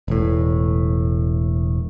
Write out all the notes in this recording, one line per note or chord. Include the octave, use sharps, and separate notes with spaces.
E1 A2